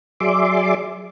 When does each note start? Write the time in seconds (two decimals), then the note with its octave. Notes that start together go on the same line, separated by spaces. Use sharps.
0.20 F#3 G#4 D5 E5 C6 D6